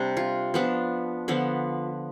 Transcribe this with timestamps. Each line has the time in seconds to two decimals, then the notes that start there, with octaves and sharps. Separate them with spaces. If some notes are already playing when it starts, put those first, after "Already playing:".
Already playing: C3 G3 D4
0.17 F4
0.54 F3 B3 D4
1.28 D3 F3 B3